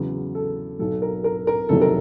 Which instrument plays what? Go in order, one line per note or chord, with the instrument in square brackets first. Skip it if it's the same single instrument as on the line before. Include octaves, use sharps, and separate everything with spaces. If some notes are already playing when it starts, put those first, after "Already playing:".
Already playing: [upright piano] E2 C#3 F#3
A4
B1 B2 F#3 A4
A#4
A#4
A#4
F#1 F2 C3 D#3 F#3 A4
A#4